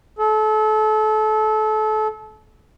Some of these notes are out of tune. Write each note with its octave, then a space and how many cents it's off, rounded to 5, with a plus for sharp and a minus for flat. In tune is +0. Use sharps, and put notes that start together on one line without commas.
A4 -30